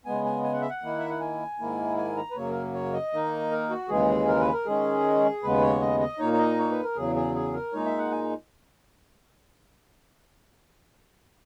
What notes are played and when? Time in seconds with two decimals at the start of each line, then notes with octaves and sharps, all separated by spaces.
0.05 C#3 G#3 B3 G#5
0.25 G#5
0.44 G#5
0.53 F#5
0.61 E5
0.70 F#5
0.82 D#3 A#3 E4
0.99 E5
1.09 F#5
1.21 G#5
1.59 G#2 D#3 A#3 E4
1.97 G#5
2.17 A#5
2.31 B4
2.36 F#2 C#3 F#3 A#3 C#5
2.49 A#4
2.74 C#5
2.93 D#5
3.13 D#3 A#3 D#4
3.51 A#4
3.70 F#4
3.89 D#2 C#3 E3 G#3 G#4
4.28 A#4
4.40 B4
4.53 A#4
4.66 D#3 G#3 C#4 G#4
5.43 D#2 C#3 G#3 B3 B4
5.62 C#5
5.81 D#5
6.00 D#5
6.19 A#2 A#3 D#4 C#5
6.33 C#5
6.38 D#5
6.59 C#5
6.71 B4
6.83 A#4
6.96 E2 C#3 F#3 G#4
7.16 G#4
7.35 G#4
7.54 A#4
7.73 A#2 G#3 D#4 C#5
7.86 E5
7.98 F#5
8.11 G#5